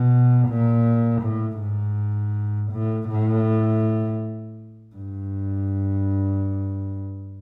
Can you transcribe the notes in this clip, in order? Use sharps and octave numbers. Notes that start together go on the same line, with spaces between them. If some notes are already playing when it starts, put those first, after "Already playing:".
Already playing: B2
A#2
A2
G#2
A2
A2
G2